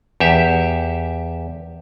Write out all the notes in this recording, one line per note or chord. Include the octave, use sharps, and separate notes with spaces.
E2 G4 E5